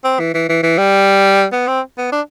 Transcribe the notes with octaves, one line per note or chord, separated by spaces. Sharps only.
C4
E3
E3
E3
E3
G3
B3
C4
B3
D4